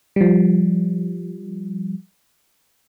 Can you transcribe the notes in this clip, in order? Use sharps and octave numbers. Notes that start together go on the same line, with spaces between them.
F3 G3